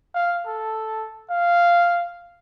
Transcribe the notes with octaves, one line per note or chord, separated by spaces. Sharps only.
F5
A4
F5